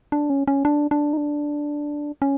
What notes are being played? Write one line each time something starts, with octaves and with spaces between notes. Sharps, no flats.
D4
C#4
C#4
D4
D4
D#4
D4
C#4